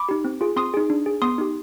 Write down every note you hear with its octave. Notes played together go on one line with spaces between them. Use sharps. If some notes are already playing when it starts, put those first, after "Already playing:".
Already playing: B5 D6
D#4 G4
C4
F4 G#4
C4 C6 D#6
D#4 G#4
D4
G#4
B3 C6 D#6
D#4 G4